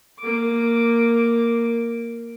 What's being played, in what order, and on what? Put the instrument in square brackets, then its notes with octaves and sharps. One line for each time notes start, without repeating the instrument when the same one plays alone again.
[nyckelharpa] A#3 D6